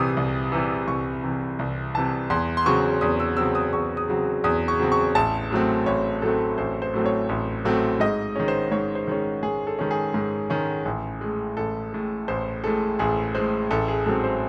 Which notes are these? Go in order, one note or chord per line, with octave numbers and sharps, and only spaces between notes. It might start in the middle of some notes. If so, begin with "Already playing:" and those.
Already playing: C2 C3 E3 D#6
C2
C3 E3
C2 C#6
C3 E3
C2
C3 E3 A5
E2 C6
C6
C#3 F#3 C4 C#6
E2 D#6
E6
C#3 F#3 C4 E6
D#6
E2 C#6
D#6
C#3 F#3 C4
E2 D#6
C#6
C#3 F#3 C4
C#6
A1 A5
A2 F#3 A3 C4
A1 C#5
A2 F#3 A3 C4 A4
A1 C5
C5
A2 F#3 A3 C4
C#5
A1
A2 F#3 A3 C4
G#2 D#5
D#3 G#3 C#4
C5
G#2 C#5
C5
D#3 G#3 C#4
G#2 G#4
A4
D#3 G#3 C#4
G#4
G#2
D#3 G#3 C#4
A1
A2 G#3
A1 A4
A2 G#3
A1 C5
A2 G#3 A4
A1 G#4
A2 G#3 C5
A1 A4
G#4
G#2 F#3 C4 A4
C5